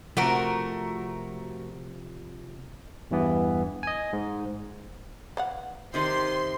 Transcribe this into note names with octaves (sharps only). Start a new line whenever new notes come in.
C3 F3 A3 F#4 A#4
E2 G2 E3 B3
D#5 G#5
G#2
B4 F5 F#5
C3 D#3 C5 D5 C6